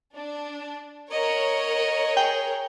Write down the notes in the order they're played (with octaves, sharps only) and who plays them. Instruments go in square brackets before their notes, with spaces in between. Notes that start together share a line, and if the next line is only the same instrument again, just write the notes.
[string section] D4
[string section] A#4 C#5 [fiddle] D#5 F#5
[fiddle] G#4 [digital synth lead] G5